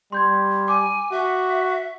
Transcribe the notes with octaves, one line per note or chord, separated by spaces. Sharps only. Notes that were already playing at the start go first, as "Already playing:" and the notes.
G3 C6 G6 G#6
G#5 D6
F#4 E5